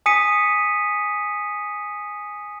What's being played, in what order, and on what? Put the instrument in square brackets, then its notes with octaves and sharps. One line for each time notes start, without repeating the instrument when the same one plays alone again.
[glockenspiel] G#5 D#6 B6 C#7 D#7